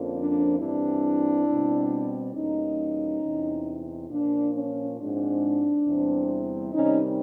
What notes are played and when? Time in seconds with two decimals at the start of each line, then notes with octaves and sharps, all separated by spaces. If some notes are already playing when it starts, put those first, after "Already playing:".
Already playing: F2 D3 F3 A#3 C#4
0.15 D4
0.58 G2 E3 G3 C4 D4 E4
1.46 B2 G3 C4
2.34 E2 B2 G3 A#3 C#4 D#4
3.22 E2 C3 E3
4.09 A#2 F3 A#3 C#4 D4
4.53 C#4
4.97 G#2 F3 G#3 C4 D4
5.86 E2 C3 E3 G3 C4
6.73 C3 D#3 G3 C#4 D#4